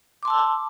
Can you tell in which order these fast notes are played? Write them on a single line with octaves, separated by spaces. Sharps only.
D6 C6 A5 E6